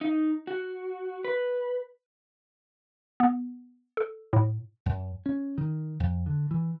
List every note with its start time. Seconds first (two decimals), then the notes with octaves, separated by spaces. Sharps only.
0.01 D#4
0.47 F#4
1.25 B4
3.20 B3
3.97 A4
4.33 A2
4.86 F#2
5.26 C#4
5.58 D#3
6.00 F2
6.26 D3
6.51 E3